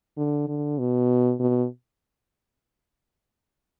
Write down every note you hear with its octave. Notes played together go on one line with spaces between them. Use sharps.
D3
D3
B2
B2